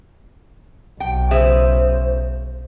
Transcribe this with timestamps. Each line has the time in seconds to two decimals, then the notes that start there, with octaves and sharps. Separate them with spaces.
1.00 B1 G5
1.31 C#3 G#4 C5 E5